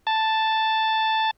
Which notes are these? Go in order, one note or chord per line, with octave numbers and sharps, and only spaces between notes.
A5